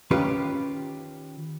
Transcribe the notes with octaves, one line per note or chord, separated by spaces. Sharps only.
D#3 C#4 F4 G4 B4